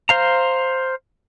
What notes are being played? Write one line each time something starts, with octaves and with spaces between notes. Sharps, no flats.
C5 F5 A#5